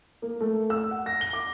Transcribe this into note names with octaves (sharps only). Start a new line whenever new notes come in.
A#3
A3
E6
F#5
A#6
G7
D6